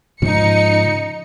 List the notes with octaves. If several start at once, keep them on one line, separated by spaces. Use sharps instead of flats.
G#2 C#3 F3 D#4 C#7